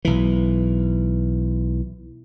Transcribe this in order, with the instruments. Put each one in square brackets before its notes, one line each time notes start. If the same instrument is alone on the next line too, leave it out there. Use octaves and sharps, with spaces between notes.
[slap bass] B1 E3